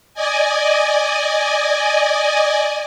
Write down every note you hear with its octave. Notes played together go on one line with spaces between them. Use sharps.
D5 D#5 G#5